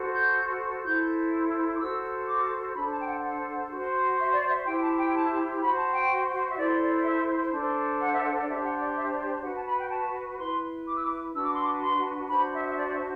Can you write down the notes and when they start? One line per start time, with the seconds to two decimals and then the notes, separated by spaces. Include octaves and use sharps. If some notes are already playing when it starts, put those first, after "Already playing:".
Already playing: F#4 A4 C5
0.13 G6
0.84 E4 A4 C5 G6
1.76 D6
1.79 F#4 A4 C5 E6
2.28 D6
2.75 D4 A4 C5 B5
2.91 A5
3.01 G5
3.07 F#5
3.23 F#5
3.71 F#4 C5
4.18 E5
4.34 D5
4.50 E5
4.66 E4 G4 C5 G5
4.82 A5
4.98 G5
5.14 A5
5.61 F#4 C5 B5
5.77 A5
5.93 G5
6.49 E5
6.56 E4 A4 C5 D5
6.81 D5
7.04 E5
7.52 D4 A4 C5
8.00 F#5
8.11 E5
8.23 F#5
8.41 D5
8.48 D4 G4 C5 E5
8.63 F#5
8.80 D5
8.96 E5
9.11 D5
9.43 F#4 B4 F#5
9.55 A5
9.67 B5
9.79 G5
9.91 A5
10.38 E4 B4 C6
10.86 D6
10.95 E6
11.03 D6
11.33 D4 F#4 B4 E6
11.44 D6
11.53 C6
11.63 D6
11.81 C6
12.29 D4 F#4 C5 B5
12.53 E5
12.66 E5
12.76 D5
12.92 E5